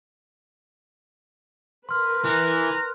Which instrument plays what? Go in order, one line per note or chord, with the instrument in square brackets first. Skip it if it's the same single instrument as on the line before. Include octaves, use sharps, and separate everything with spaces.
[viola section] A#4 B4 [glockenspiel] C6 F6
[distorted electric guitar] E3 [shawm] A#5 [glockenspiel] F#6